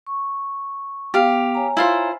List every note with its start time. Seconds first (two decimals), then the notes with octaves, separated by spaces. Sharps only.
0.07 C#6
1.14 B3 G4 F5
1.55 C#5 G#5 A#5
1.77 E4 F4 C5